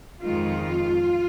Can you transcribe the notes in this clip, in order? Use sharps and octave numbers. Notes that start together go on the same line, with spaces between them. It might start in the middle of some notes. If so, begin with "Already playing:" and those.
F2 D#3 G#3 F4